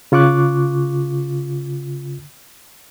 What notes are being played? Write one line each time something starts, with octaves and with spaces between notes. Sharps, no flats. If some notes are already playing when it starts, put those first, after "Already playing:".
C#3 F4 C#6 D6 F#6